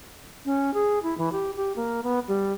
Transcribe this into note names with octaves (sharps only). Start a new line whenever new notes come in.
C#4
G#4
E4
E3
G4
G4
A#3
B3
G3